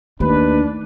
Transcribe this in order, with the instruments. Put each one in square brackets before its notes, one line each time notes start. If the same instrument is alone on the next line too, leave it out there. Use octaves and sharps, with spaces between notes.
[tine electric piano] D#2 [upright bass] A3 D#4 [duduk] D4 [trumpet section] B4